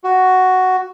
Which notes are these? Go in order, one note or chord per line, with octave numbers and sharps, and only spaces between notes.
F#4